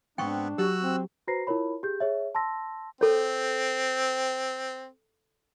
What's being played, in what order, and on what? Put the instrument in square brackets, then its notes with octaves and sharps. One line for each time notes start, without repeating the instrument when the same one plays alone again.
[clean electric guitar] E2 G#2 [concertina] B3 C4 [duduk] D4 [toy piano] G5 C#6
[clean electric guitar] F#3 [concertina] F#4 E6 F#6 [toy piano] G4
[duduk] C4
[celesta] F#4 B4 C5 A#5 A#6 C7
E4 F4 A#4 C#5 B5
G4 G#4 G6
G#4 C#5 E5
A5 C6 E6 A#6
[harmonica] C4 [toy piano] A4 C#5